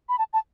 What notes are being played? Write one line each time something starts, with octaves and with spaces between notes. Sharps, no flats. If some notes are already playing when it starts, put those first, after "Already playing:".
B5
A5
A5